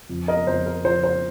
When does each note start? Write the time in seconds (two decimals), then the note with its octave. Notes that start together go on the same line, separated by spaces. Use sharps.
0.09 F2
0.28 A#4 D#5
0.47 F2 C5
0.66 A#4
0.85 F3 C5
1.04 C5